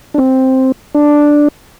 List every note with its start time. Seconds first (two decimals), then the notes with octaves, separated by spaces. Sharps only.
0.14 D4
0.18 C4
0.95 D4